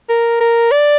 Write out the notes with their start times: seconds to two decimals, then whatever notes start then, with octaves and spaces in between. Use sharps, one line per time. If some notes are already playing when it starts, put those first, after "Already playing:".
0.09 A#4
0.40 A#4
0.72 D5